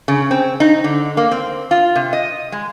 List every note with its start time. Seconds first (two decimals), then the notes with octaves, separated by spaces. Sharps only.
0.08 C#3
0.31 C4
0.60 D#4
0.84 D3
1.17 A#3
1.31 C4
1.71 F4
1.95 C3
2.13 D#5
2.52 G#3